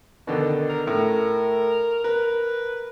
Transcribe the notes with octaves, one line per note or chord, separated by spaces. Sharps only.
B2 D3 D#3 D#4
A#4
A2 A#4
A#4 B4